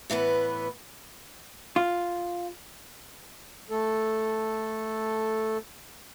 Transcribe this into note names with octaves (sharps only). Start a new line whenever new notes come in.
A2 E3 B3 B4
F4
A3 A4